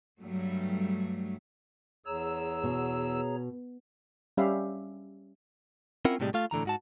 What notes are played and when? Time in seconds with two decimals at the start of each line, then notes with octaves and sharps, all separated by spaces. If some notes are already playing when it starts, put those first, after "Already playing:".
0.21 G2 F#3 G3 A3
2.06 E2 G#4 C#5 A#5 E6
2.63 B2
4.37 G3 C#4 G4 E5 F5 B5
6.05 C4 C#4 E4 F4 A#4 F#5
6.20 A2 C3 E3 G3 G#3
6.34 A3 F4 F5
6.51 A2 D3 E3 A#5
6.65 G#2 F#4 A5